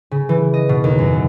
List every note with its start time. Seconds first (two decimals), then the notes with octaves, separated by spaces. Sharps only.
0.11 C#3
0.29 E3
0.54 D#5
0.69 B2
0.84 D#2
0.99 F#2
1.13 E3